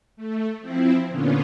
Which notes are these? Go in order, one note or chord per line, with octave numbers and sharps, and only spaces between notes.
A3
F3 C4 E4
A#2 D3 B3 C#4 F4